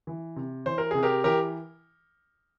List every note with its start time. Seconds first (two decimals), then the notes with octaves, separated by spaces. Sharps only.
0.07 E3
0.36 C3
0.66 E3 C5
0.78 A#4
0.91 C3 G#4
1.03 G4 A#4
1.24 E3 G4 A#4